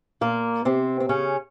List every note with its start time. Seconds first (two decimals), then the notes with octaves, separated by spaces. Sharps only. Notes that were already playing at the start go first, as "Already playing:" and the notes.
0.21 A#2 A#3
0.65 C3 C4
1.00 C4
1.09 C#3 C#4